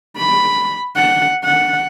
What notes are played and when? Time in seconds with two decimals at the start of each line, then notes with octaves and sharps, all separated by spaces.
0.17 B5
0.96 F#5
1.45 F#5